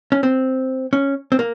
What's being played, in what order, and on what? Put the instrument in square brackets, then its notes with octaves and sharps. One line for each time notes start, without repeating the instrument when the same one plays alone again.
[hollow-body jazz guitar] C#4
C4
C#4
C4
A#3